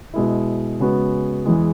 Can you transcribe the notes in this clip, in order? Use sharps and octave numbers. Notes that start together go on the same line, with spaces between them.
B2 G#3 E4
C#3 G#3 B3 F#4
E2 E3 G#3